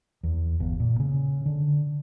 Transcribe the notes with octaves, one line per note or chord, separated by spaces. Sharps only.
E2
G1
A#2
C#3
D3